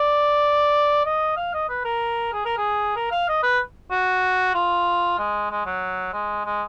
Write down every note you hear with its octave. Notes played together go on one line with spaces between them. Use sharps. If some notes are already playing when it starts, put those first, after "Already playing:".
Already playing: D5
D#5
F5
D#5
B4
A#4
G#4
A#4
G#4
A#4
F5
D#5
B4
F#4
F4
G#3
G#3
F#3
G#3
G#3